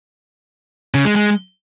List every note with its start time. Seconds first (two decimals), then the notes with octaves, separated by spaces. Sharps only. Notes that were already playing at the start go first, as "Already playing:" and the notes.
0.94 C#3
1.05 G#3
1.16 G#3